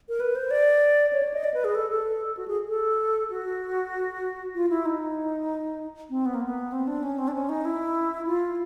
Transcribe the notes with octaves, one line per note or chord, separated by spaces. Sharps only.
A#4
B4
C5
D5
C#5
D5
D#5
D5
B4
G#4
A4
A4
F#4
G#4
A4
F#4
F4
E4
D#4
C4
B3
A#3
B3
C4
D4
C#4
C4
D4
C#4
D#4
E4
F4